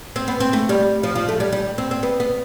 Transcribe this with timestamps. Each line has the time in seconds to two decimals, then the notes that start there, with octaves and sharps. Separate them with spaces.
0.16 C4
0.28 B3
0.40 C4
0.53 A3
0.69 G3
1.03 F3
1.16 F3
1.29 A3
1.40 G3
1.52 G3
1.78 C4
1.91 C4
2.03 B3
2.20 B3